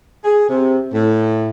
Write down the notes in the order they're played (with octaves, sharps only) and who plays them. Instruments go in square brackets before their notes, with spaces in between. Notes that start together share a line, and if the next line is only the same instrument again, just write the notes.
[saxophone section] G#4
C3
A2